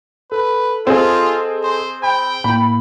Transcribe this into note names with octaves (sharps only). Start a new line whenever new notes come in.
A4 B4
C4 F4 G#4 A4 D#5
C5
G5 B5
A2 A#3 B5